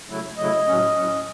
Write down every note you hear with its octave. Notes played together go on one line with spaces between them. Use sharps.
C#3 F#3 A3 E4
C#3 F#3 A3 E4 D#5
A2 F#3 C#4
A2 F#3 C#4